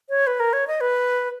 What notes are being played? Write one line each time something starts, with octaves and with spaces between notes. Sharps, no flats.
C#5
B4
A#4
C#5
D#5
B4